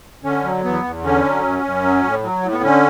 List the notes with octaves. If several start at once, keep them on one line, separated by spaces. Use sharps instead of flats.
D3 C#4
F#3
E2 B3
E2
D3 C#4
F#3
F#2
F#2
F#3
A2
F#3
A2
B3
D3 C#4